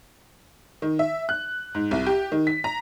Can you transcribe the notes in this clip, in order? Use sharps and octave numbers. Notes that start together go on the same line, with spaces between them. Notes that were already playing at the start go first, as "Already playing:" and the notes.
D#3
E5
F#6
G#2
C2
G4
D#3
B6
A#5